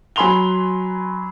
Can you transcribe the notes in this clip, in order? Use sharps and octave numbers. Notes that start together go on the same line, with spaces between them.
F#3 G#5 B5 C6 F7 G7